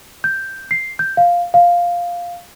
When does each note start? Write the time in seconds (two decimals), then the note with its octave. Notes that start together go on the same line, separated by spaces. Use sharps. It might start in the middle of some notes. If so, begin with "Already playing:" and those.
0.24 G6
0.71 C7
0.99 G6
1.17 F5
1.54 F5